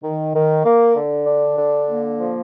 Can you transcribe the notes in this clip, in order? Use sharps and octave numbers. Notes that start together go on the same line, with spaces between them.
D#3
D#3
A#3
D3
D4
D3
A#3
F3